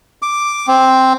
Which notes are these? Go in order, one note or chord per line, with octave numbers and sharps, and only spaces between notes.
D6
C4